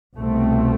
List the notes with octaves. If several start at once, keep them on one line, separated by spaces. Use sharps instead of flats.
C2 B2 A3 C4